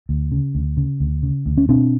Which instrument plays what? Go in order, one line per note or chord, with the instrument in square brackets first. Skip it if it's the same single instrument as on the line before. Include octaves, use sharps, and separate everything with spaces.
[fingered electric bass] D2
C#3
D2
C#3
D2
C#3
D2
C#4
B2 C4 D4